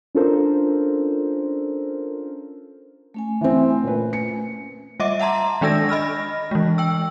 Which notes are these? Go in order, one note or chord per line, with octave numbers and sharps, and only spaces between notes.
C#4 D4 F4 A4 A#4 C5
A3 C#4 G#5
E3 C4
A#2 B4
C#7
G3 D#5 E5 D6
E5 F#5 A5 A#5 C6
D#3 G#3 D4 A4 E6 A#6
D#5 B5 F6 A#6
E3 G#3
G5 E6